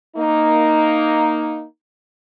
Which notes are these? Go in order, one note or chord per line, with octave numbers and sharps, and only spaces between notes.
A#3 D#4